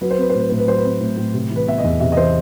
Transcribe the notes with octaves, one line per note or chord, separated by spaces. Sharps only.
F#3 B4
C5
C4 B4
C5
A2
B4
A2 C5
B4
F#3 C5
B4
C4
A2
A2
C3
E3
B4
B3 E5
D#5
E2
C3 E5
D#5
E3 C5